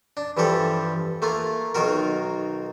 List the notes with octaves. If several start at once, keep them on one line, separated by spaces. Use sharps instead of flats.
D4
G2 E3 F3 G4 A4
A3 A#3 F4
B1 D#3 F4 F#4 A#4